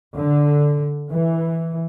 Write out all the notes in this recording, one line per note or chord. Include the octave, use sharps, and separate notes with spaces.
D3
E3